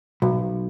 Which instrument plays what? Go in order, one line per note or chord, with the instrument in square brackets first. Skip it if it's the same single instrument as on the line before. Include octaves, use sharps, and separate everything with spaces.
[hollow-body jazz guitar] B1